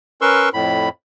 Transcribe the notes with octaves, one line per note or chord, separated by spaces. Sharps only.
C#4 A#4 B4 C6 C#6 E6
F2 A2 B5